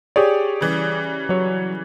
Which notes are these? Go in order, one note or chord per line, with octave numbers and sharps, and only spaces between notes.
G4 G#4 C#5 D5
C#3 E3 G3
F#3 C#5